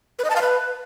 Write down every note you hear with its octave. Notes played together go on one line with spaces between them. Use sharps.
B4
D#5
A5
F5
B4